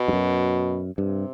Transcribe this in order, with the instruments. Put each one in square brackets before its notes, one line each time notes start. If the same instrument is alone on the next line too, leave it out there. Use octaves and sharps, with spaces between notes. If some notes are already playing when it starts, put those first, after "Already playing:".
Already playing: [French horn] B2
[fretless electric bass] G2
F#2
[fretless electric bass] G2 [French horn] C3